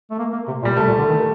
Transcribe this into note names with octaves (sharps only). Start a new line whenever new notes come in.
A3
A#3
A#3
C3
A#2
G3
C3 A3
A#2
D3
D#3